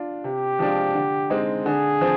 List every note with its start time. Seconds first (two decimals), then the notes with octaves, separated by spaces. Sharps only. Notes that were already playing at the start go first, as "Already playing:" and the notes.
Already playing: D4 F4
0.24 C3 G4
0.59 F3 G#3 D4 F4
0.95 D3
1.30 G#3 C4 D#4
1.66 D3 G#4
2.01 F3 C4